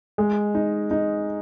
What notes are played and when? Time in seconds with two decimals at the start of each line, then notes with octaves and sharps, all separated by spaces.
0.18 G#3
0.55 D#4
0.91 D#4